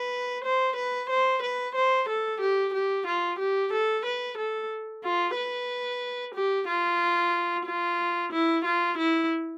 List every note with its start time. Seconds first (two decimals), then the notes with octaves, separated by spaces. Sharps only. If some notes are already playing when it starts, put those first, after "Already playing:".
Already playing: B4
0.44 C5
0.76 B4
1.09 C5
1.42 B4
1.75 C5
2.08 A4
2.40 G4
2.73 G4
3.06 F4
3.39 G4
3.72 A4
4.05 B4
4.37 A4
5.04 F4
5.36 B4
6.34 G4
6.67 F4
7.66 F4
8.32 E4
8.65 F4
8.98 E4